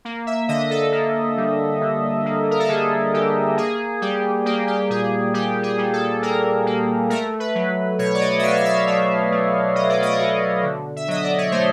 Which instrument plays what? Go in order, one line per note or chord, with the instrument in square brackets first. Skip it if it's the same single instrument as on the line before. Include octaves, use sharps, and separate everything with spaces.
[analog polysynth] A#3
E5
D3 D#5
A4
A#3
G3
D3
A#3
A#4
A4
D3 G#4
D3 G4
A#3 G#4
G3 G4
A#3 G4
G4
A#2 G#4
G3 G4
G#4
G3
A4
A#3 A#4
A#3
A3 A#4
B4
F#3
B2 C#5
D5
D#5
E5
F#3 F5
F5
E5
A3 E5
A3
F#3 D#5
D5
D#5
C#5
B2 D5
D3
E5
F#3 D#5
D5
C#5
A3 C5